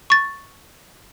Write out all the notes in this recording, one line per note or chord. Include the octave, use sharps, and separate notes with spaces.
C#6 A6